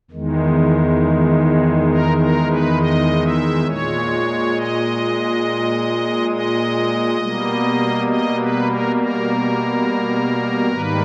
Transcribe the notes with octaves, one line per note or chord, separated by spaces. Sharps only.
E2 D#3 G#3
A#4
A#4
B4
D#5
E5
A#2 G#3 C#5
D#5
D#5
B2 G3 A#3
D#5
B4
A#4
A#4
G#2 D#3 G3 A#3 B4